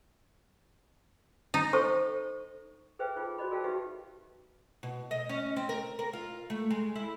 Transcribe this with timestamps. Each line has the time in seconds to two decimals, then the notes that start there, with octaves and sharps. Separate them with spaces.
1.54 D#4
1.73 A4 C5 C#6
2.99 G#4 B4 C5 E5 F5 G5
3.16 D#4 F4 G#4
3.38 F#4 C5 D5 D#5 B5
3.51 G#4 A#4 D5 F5 G5 A5
3.64 D#4 F#4 G4 B4 E5 F5
4.83 B2
5.11 D#5
5.29 C#4
5.56 C4
5.69 A#4
5.99 A#4
6.13 F4
6.50 A3
6.70 G#3
6.96 E4